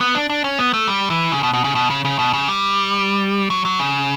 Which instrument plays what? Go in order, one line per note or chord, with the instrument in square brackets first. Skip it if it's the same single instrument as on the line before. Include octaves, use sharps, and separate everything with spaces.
[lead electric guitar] B3
D4
D4
C#4
B3
A3
G3
E3
C#3
B2
B2
C#3
B2
C#3
C#3
B2
C#3
G3
F#3
F#3
C#3